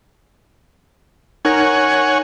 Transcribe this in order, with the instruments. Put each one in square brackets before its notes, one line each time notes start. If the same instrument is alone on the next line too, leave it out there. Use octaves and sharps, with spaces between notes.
[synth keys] D#4 A#4 A#6 [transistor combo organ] C#5 F#5 G#5